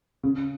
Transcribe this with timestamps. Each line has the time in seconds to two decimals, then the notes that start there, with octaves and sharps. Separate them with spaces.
0.23 C#3